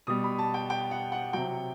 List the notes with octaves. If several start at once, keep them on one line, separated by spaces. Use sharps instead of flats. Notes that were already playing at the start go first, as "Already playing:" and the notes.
B2 G3 D#6
B5
A5
G5
G5
F#5
F#5
C3 F#3 G5